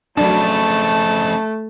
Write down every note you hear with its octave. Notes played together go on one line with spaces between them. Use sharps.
F2 C#3 F#3 A3 D4 A5